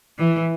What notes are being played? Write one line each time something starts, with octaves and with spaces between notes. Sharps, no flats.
E3